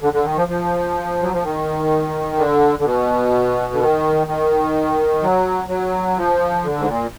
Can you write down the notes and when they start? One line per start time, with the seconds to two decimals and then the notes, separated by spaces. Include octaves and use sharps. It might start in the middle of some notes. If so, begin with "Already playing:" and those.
0.02 D3
0.13 D3
0.25 D#3
0.37 F3
0.48 F3
1.22 F#3
1.33 F3
1.43 D#3
2.38 D3
2.79 D3
2.85 B2
3.73 D3
3.80 D#3
4.27 D#3
5.22 F#3
5.68 F#3
6.17 F3
6.64 D3
6.78 G#2
6.87 A#2